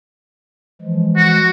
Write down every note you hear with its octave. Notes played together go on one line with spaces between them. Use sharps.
E3 F3 G#3
F#4